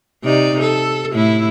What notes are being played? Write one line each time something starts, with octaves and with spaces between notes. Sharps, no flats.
C3 D#4 D5
A4
A2 E4